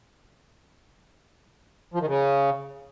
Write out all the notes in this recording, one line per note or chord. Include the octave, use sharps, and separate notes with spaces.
F3
D#3
C#3